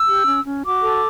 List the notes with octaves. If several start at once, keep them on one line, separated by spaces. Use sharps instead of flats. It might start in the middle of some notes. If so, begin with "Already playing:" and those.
Already playing: E6
G4
C#4
C#4
F#4 D6
A4